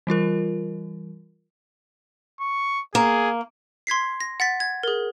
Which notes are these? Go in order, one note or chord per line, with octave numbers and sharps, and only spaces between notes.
E3 G3 F4 A#4
C#6
A#3 G#4
C6 G#6 B6 C7
A#6
F#5 A6 B6
G#6
G#4 A#4